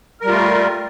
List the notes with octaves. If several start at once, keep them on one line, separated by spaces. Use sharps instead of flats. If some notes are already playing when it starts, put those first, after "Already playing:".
G3 A3 F4 A#4